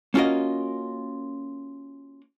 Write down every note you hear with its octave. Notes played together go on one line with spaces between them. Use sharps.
A#3 C#4 F4 F#4 A#4 D#5